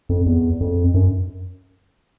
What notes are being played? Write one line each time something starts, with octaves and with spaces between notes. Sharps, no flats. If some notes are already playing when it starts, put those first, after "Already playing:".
F2
E2
F2
F#2